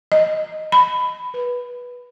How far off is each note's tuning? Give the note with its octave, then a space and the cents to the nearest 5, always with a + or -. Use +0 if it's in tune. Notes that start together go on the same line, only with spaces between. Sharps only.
D#5 +0
B5 +15
B4 -15